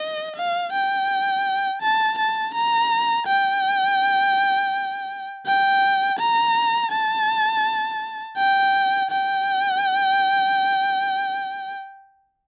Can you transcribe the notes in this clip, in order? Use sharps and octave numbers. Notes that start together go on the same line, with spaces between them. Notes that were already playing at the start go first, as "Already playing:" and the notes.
Already playing: D#5
F5
G5
A5
A5
A#5
G5
G5
A#5
A5
G5
G5